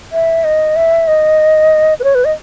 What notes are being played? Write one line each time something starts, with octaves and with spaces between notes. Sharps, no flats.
E5
D#5
E5
D#5
B4
C#5
B4
D#5